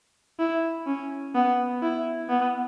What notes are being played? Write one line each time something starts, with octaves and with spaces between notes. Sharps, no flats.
E4
C#4
B3
E4
B3